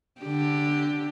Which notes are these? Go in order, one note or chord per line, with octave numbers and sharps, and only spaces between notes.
D3 G4